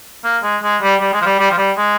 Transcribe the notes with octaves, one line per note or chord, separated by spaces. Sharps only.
A#3
G#3
G#3
G3
G3
G#3
F3
G3
G3
F3
G3
G#3